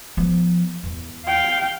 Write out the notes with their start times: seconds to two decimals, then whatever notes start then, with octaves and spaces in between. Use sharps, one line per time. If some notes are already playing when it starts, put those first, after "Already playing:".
0.17 F3 B3
0.83 E2
1.26 F5 G5